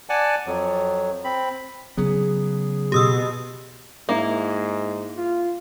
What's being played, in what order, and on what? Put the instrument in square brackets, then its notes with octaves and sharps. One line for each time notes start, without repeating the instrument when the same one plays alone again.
[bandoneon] D5 F#5 G#5 A5
F2 F#3
C4 B5
[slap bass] C#3 F#3 B3 [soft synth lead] G#4
[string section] B2 [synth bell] G4 D#6 E6
[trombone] G#2 [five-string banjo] A#3 E4
[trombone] F4